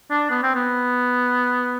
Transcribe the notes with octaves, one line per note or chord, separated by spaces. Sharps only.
D4
B3
C4
B3